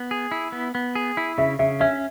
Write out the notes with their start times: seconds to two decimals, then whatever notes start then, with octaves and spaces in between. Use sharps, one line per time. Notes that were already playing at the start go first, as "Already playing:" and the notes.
Already playing: B3
0.11 G#4
0.32 E4
0.52 B3
0.75 B3
0.95 G#4
1.17 E4
1.38 C#3 E5
1.59 C#3 E5
1.80 C#4 E5